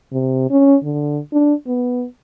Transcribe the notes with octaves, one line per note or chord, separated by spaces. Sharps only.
C3
C#4
D3
D4
B3